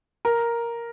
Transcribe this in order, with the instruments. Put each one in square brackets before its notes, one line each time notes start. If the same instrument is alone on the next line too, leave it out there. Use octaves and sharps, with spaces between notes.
[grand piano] A#4